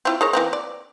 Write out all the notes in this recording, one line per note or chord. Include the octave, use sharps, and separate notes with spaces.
C4 E4 F4
G#4 A#4 C#5
E3 A#3 C4
D5